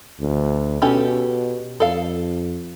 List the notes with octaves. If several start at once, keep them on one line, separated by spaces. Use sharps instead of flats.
D2
B2 C#4 G4 A4
F2 A4 F5